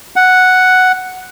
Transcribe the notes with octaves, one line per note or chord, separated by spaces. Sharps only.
F#5